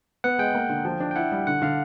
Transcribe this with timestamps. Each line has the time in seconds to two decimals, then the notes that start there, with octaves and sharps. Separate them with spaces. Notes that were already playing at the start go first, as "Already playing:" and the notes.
0.24 B3 F#5
0.39 G#3 G5
0.55 A#3
0.69 D3
0.85 F3
1.00 D4
1.11 G5
1.16 E4 F#5
1.32 G3
1.47 D3 F#5
1.62 D3 F5